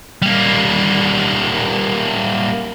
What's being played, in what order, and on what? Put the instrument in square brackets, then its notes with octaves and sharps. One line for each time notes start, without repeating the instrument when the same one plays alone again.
[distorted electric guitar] G3 A#3